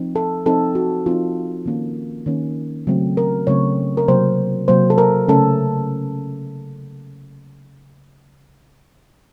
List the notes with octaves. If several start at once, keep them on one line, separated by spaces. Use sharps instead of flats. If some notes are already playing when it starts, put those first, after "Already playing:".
Already playing: F3 C4 D#4
A4
F3 C4 D#4 A4
F#4
F3 C4 D#4 F4
D#3 A#3 C#4
D#3 A#3 C#4
C#3 F#3 A3 C4
A#4
C#3 F#3 A3 C4 C#5
A#4
C3 F#3 A#3 C5
C3 F#3 A#3 C5
A4
A#4
C#3 A3 C#4 A4